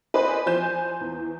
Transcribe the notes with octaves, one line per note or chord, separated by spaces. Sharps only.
B4 C5 D5 D#5 G#5 B5
F3 C5 G#5 G6 E7
E2